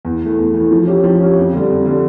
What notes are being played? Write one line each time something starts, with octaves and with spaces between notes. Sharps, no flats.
E2
E3 A3
E2
E3 A3
F3
C#4 G4
F3
C#4 G4
F2
D3 G3
F2
D3 G3